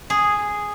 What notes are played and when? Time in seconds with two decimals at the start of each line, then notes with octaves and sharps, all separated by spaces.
0.10 G#4